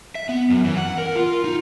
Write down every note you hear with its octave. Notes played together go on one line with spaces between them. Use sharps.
E5
B3
F#2
E3
F#5
A#4
F4
D#4